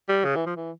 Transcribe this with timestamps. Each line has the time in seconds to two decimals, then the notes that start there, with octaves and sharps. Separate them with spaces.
0.09 G3
0.24 C#3
0.36 E3
0.46 F3
0.56 E3